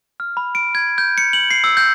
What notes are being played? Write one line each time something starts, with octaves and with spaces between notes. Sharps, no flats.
F6
B5
D7
G#6
G6
C#7
F#7
C7
E6
G6